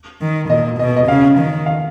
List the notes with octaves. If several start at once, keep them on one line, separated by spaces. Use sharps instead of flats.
D#3
A#2 D#5
B2 D#5
D#5
C#3 F5
D#3
F5